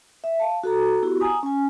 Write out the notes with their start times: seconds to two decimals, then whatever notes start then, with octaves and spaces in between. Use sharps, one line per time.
0.24 E5
0.40 F5 A5
0.64 F#4 A4 A#5
1.02 B3 E4 F#4 G4
1.21 G#5 A#5 D#6
1.43 C#4 G#5